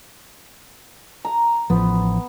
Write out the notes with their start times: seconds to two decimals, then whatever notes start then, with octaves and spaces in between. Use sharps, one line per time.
1.25 A#5
1.70 A1 F3 B3